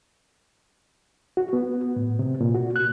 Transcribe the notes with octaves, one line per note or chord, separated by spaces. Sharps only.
F#4
B3
A2
C3
A#2
F#4
F#6